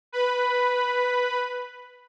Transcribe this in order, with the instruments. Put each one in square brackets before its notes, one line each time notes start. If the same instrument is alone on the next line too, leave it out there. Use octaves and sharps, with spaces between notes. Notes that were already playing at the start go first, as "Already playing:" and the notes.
[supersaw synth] B4 B5